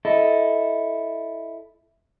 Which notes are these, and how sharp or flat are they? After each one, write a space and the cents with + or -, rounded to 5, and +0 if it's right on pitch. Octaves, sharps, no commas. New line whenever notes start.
E4 +0 A4 +0 D#5 +0